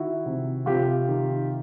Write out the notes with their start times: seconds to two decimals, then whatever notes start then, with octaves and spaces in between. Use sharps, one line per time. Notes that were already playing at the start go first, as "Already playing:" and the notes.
Already playing: D#3 E4 F#4
0.26 C3
0.66 C3 F4 G4
1.08 D#3